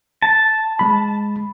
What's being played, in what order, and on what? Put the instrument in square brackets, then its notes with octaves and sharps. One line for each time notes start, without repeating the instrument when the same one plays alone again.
[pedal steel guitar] A5
[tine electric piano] G#3 B5